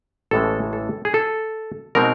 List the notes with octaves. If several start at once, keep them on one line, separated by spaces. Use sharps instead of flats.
A1 A2 E3 G#3 C#4 A4
A4
G#4
A4
B2 G#3 C4 D#4 A#4